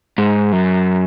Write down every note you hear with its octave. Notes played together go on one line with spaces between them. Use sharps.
G#2
F#2